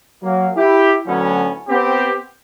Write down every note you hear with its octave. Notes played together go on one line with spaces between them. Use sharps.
F#3 A#3
E4 G4
D2 A2 F#3 B3 C#4
B3 C4 G4